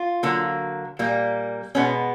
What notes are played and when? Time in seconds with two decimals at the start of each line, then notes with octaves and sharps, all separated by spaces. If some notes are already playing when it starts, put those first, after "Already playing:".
Already playing: F4
0.23 D3 F#3 A#3
0.99 A#2 G3 A#3
1.75 B2 G#3 B3 C#4